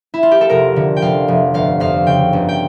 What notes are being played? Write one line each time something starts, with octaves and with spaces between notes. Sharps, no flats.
E4
F4
G4
A4
F1 A#4
D3
G5
F1 F5
F1
G1 F5
F2 F5
C#3 G5
G1
G5